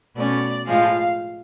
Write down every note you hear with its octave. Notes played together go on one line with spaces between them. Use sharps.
B2 A3 C#4 D5
A2 F3 G#3 F5